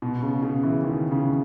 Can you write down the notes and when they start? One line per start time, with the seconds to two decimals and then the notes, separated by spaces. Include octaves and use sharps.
0.02 B2
0.23 C#3
0.42 C#3
0.63 E3
0.83 D#3
1.11 C#3